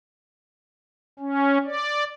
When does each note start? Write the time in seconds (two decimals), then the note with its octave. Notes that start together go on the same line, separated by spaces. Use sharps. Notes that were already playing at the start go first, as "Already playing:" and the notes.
1.19 C#4
1.65 D5